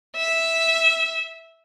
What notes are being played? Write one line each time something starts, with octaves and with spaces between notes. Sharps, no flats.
E5